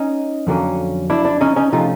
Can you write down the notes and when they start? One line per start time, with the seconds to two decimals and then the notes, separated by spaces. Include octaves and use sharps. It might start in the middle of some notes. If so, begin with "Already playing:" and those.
Already playing: C#4 D#4
0.47 F2 D3 F#3 A#3 C#4
1.10 D4 E4
1.25 D4
1.41 C#4 D#4
1.56 C#4 D#4
1.72 C3 F3 A3 C#4 D#4 F4